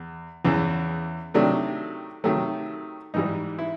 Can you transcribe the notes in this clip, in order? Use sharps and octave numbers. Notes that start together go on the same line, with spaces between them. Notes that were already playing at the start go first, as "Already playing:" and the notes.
Already playing: E2
E2 C#3 E3
C3 D#3 F#3 A3 D4
C3 D#3 F#3 A3
G#2 E3 G3 D#4
E4